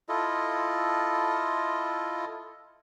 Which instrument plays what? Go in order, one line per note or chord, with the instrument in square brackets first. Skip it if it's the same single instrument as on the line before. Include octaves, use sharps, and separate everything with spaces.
[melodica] E4 F4 A4 D#5